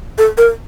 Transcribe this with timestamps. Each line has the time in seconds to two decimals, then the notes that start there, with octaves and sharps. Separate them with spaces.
0.18 A4
0.38 A#4